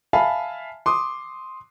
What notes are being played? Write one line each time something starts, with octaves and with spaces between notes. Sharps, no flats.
E5 F5 G#5 A5 B5
C6 D6 D#6